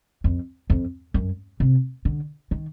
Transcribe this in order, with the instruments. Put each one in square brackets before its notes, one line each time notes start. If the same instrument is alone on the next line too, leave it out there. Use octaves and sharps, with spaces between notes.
[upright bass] F2
F2
F#2
C3
D3
D#3